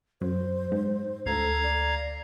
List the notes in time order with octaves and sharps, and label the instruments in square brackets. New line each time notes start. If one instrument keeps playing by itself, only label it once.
[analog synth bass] F#2 [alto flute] C5
[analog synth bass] G#2
[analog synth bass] D2 [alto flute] A4 [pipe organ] F5 A#5 G#6
[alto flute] D5